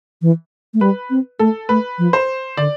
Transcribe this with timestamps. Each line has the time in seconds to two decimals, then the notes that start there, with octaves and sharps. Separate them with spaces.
0.22 E3
0.74 A3
0.81 G3 B4
1.10 C4
1.39 A3 A4
1.69 A3 B4
1.98 F3
2.13 C5
2.57 D3 D5